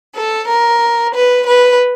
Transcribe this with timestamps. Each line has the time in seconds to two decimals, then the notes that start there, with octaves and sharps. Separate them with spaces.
0.15 A4
0.48 A#4
1.14 B4
1.47 B4